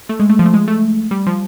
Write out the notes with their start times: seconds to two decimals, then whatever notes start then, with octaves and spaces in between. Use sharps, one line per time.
0.09 A3
0.20 G#3
0.30 A3
0.39 F3
0.46 A3
0.54 G#3
0.68 A3
1.11 G3
1.27 F3